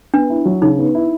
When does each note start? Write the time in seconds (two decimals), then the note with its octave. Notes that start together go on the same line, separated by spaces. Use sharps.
0.14 B3 D4
0.30 E4
0.45 F#3
0.62 C#3 D#4
0.79 B3
0.95 E4